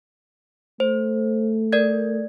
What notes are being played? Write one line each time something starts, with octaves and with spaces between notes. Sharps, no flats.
A3 C5
A#4 D5 G#6